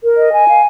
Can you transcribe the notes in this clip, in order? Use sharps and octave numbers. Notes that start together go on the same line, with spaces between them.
A#4
D#5
G#5
F5